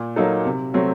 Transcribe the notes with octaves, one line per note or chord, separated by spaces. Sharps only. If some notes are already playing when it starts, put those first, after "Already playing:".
Already playing: A#2
F#3 A#3 D#4 A4
C3
F#3 A3 C4